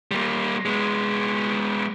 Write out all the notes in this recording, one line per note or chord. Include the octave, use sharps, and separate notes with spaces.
G3 A#3
G#3 B3